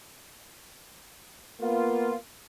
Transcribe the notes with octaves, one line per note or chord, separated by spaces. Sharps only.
A#3 B3 F4